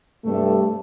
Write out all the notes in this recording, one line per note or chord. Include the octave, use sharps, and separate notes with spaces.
G2 C3 G3 A3